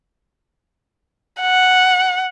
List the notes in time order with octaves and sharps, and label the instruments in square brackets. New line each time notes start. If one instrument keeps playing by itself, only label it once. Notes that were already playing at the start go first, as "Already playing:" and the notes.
[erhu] F#5